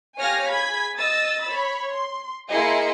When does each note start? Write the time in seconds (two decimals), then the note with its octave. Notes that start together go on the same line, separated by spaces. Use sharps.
0.20 G4 C#5 F5 G#5 F6 A#6
0.50 G#4 B5 G#6 B6
0.97 D#5 D#6 E6 A6
1.46 C#5 B5
1.95 C6
2.50 A#3 E4 G#4 D#5 C6 C#7